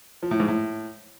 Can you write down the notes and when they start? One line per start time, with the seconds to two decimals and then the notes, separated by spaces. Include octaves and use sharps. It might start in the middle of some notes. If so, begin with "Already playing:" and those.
0.23 F3
0.31 A2
0.40 G#2
0.48 A2